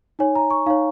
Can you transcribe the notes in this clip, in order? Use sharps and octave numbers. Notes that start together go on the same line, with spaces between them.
D#4 C#5 G#5
A#5
C#6
D#4 C#5 F5